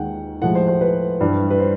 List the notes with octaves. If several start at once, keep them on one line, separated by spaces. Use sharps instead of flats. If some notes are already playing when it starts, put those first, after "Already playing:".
Already playing: D#2 D#3 G#3 F#5 G5
A2 F3 G#3 F#5
C5
C5
B4
G2 E3 G3
B4
C5